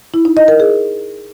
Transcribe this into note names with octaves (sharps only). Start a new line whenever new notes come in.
E4
D#4
D#5
A#4
G#4